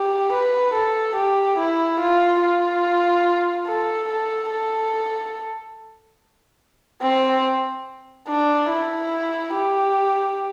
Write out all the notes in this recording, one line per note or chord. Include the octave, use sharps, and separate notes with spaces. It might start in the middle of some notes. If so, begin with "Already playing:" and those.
Already playing: G4
B4
A4
G4
E4
F4
F4
A4
A4
A4
C4
D4
E4
G4